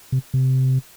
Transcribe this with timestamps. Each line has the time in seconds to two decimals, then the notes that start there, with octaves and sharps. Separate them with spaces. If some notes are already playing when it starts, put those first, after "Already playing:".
0.12 C3
0.34 C3